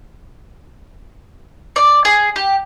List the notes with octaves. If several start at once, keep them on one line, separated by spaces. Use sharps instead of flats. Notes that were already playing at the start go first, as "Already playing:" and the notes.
D5
G#4
G4